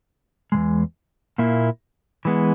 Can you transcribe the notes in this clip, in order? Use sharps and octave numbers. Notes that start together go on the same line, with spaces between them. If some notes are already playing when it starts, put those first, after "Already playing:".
E2 C#3 G#3
A#2 A#3 E4
E3 G#3 B3